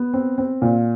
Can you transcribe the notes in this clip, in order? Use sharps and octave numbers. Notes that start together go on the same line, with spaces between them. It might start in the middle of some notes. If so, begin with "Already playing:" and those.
Already playing: B3
C4
C4
A#2